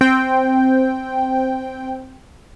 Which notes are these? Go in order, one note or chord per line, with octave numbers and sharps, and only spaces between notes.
C4 G5